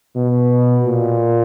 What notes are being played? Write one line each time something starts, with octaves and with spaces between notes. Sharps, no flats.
B2
A#2